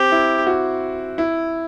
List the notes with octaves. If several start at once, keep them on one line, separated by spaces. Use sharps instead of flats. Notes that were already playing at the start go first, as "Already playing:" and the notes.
Already playing: C4 G4
E4
F#4
E4